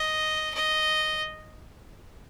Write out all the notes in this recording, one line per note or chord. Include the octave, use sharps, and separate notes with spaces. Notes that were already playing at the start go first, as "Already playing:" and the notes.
Already playing: D#5
D#5